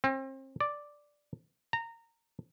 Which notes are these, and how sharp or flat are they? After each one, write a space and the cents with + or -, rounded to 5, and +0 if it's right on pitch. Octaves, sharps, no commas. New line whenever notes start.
C4 +35
D5 +0
A#5 -20